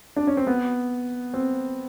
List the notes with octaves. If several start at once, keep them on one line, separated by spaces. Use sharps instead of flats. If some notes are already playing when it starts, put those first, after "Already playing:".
D4
C#4
C4
B3
C4